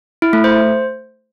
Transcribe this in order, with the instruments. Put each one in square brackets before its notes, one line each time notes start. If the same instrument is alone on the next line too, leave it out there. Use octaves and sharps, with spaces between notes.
[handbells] E4
A3
C5